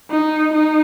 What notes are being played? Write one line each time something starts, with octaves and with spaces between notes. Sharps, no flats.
D#4
D#4